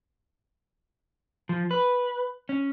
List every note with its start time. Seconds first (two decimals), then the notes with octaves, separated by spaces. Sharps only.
1.49 F3
1.71 B4
2.49 C#4